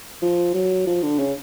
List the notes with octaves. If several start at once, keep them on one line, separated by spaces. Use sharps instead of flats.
F3
F#3
F3
D3
C#3